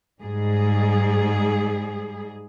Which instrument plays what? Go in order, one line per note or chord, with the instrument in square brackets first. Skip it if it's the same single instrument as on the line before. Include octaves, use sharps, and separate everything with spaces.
[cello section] G#2 G3 G#4